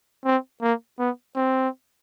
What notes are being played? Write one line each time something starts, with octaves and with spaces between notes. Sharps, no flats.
C4
A#3
B3
C4